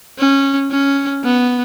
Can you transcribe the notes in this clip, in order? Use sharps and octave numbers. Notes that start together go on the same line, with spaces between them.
C#4
C#4
B3